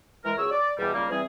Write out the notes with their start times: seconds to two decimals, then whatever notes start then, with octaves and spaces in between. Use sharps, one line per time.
0.25 E3 G#3 A#4
0.37 C#2 F#3 F#4 G#4 C#5 E6
0.51 D5
0.78 E2 B2 G3
0.93 C#2 G3 A#3
1.09 E2 E3 G3 C4 G#4